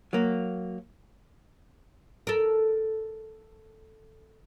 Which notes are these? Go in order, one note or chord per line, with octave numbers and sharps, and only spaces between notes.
F#3 A#3
A4 A#4